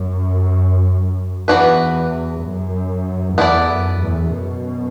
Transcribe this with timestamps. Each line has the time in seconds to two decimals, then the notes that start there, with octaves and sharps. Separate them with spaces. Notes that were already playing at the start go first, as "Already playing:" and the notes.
Already playing: F#2
1.48 E2 E3 B3 D4 F#4 B4
2.43 F#2
3.37 E2 B3 E4 A4 D5
3.69 F#2
4.00 E2 A2
4.33 F#2 B2